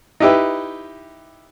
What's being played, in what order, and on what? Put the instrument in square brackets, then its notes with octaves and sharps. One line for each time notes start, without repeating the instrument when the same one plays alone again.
[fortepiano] D#4 E4 G4 B4 E5